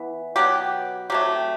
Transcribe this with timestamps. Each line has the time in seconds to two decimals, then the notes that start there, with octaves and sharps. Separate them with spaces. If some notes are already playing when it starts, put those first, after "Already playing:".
Already playing: E3 B3
0.36 B2 F#3 B3 G4
1.10 C3 F#3 A3 G4